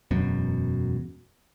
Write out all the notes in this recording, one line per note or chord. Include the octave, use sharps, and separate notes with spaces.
E1 F#2 B2